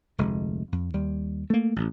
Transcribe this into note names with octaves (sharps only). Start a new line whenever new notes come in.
F1 D2 G#3
F2
D#2 G3
A3 A#3
A1